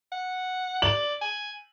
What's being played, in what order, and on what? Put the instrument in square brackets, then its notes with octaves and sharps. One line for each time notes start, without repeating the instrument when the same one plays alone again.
[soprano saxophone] F#5
[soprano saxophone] D5 [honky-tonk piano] F#7
[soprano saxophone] G#5